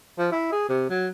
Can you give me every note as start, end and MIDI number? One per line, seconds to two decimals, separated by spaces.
0.18 0.29 53
0.32 0.48 64
0.52 0.68 68
0.69 0.87 48
0.90 1.08 54